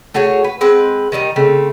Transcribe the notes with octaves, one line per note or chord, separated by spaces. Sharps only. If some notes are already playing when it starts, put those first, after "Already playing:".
A3 F#4 G#4 C#5
B4
G#3 C4 B4 F#5
D#3 G3 C#4 D#4
C#3 A3 C4